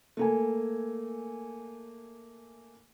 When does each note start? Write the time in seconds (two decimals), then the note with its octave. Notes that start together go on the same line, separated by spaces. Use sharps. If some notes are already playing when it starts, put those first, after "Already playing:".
0.17 A3 A#3 G#5